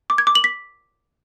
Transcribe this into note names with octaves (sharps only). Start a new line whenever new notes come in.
D6
G#6
D6
F#7
B6